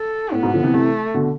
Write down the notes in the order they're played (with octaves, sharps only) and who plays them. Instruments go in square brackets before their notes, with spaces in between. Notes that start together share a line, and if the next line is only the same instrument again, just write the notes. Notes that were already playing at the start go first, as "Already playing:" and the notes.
Already playing: [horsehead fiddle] A4
[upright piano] A2 [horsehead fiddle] B3
[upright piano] G#2 B2
D3 F3
C3 E3
[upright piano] C3 E3 [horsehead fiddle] A3
[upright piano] B2 D3